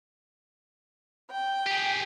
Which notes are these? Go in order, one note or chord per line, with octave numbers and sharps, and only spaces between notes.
G5
G4 G#4